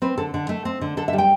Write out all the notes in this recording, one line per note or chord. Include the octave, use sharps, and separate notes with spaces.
C4 B4
D3 A4
D3
A3
C4
D3
D3 A4
E5
G3
G5